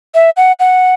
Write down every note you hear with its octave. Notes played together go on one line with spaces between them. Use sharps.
E5
F#5
F#5